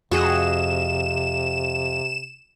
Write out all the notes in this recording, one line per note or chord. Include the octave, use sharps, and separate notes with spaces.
F2 C3 F#4 G#4 D#5 E7